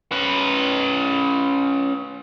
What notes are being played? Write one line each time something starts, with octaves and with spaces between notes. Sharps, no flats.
C#4 B4